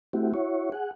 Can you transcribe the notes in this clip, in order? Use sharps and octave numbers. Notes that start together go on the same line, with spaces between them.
A3 C4 E4 F#4 G4
E4 F#4 C#5
G#4 F#5